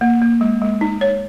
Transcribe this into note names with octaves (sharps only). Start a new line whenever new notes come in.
A#3
A#3
G#3
G#3
D#4
C#5